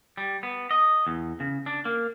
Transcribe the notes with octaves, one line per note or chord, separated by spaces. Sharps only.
G3
B3
D#5
E2
C#3
D4
A#3